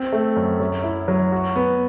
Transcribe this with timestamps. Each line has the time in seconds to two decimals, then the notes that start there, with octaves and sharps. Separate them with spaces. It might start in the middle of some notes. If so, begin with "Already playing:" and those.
Already playing: C4
0.12 A3
0.36 F#2
0.60 F#3
0.84 E4
1.08 F#3
1.32 F#4
1.56 B3